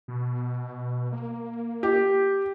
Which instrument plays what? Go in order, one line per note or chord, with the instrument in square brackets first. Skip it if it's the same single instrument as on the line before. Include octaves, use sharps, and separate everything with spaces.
[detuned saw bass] B2
A#3
[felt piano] G4